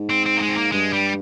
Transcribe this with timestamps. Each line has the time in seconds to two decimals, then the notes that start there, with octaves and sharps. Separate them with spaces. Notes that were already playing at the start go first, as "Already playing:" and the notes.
Already playing: G#2
0.10 C4
0.26 C4
0.37 A#3
0.41 G#3
0.49 C4
0.57 A#3
0.72 G2 G#3
0.93 G3